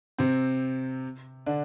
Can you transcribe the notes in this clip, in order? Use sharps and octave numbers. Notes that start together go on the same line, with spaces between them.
C3 C4
D3 D4